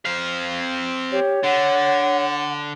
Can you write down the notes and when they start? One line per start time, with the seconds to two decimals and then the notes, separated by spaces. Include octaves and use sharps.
0.05 C4 F5
1.12 G4 C#5
1.44 D3 F#5